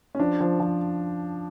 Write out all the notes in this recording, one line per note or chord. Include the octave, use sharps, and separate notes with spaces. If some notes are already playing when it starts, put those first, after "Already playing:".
C#4
F3 D4
F3
F3